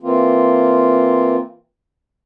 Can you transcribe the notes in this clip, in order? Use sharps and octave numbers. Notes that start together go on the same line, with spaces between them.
E3 A#3 C4 F4